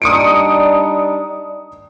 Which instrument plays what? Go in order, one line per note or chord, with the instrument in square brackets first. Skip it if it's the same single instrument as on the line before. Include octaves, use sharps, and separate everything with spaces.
[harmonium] G3 D4 D#4 [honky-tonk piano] D#6 C#7 D7